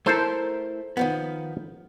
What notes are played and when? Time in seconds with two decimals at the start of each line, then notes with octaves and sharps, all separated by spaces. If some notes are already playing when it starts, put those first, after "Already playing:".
0.06 A3 E4 A4 A#4 C5 A5
0.97 D#3 F3 B3